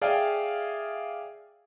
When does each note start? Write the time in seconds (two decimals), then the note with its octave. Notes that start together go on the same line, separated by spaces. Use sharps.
0.02 G#4 D5 E5 F5 G5 G#5